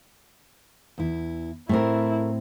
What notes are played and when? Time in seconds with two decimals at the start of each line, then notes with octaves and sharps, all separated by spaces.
0.98 E2 E4
1.69 A2 A3 C4 E4 A#4